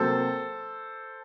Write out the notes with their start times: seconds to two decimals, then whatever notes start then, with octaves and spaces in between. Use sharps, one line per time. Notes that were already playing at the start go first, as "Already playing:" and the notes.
Already playing: C3 F#3 A#3 A4 C5